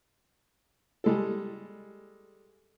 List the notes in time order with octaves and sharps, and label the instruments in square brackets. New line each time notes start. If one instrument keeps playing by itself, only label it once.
[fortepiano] G3 G#3 A4